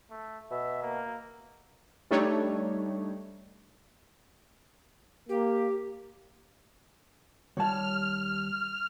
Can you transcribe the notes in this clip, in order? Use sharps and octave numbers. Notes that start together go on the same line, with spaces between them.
A3
B2 E5
A#3
G3 A3 D4 D#4 C#5
A#3 G4
D#2 G3 C#5 F#5 A5 F6